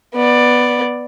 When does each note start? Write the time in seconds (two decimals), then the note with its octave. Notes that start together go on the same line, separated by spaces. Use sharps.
0.15 B3 D5